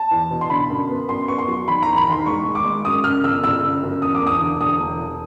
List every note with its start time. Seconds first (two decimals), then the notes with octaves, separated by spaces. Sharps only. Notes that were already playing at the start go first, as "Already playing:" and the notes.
Already playing: A5
0.11 E2
0.30 B2
0.41 C6
0.50 D3 B5
0.70 F#2
0.89 B3
1.09 F#2 C6
1.28 B3 C#6
1.38 C6
1.48 F#3
1.68 D#3 B5
1.82 E1 A#5
1.97 B5
2.07 D#3 C6
2.26 G#3 C#6
2.45 G#3
2.55 D6
2.65 G#3
2.85 F#2 D#6
3.04 C#3 F6
3.24 G1 E6
3.44 G1 E6
3.63 C#3
3.83 F#2
4.02 E1 D#6
4.15 D6
4.22 E1 D#6
4.41 D3
4.61 E1 D#6
4.80 E1
5.00 E1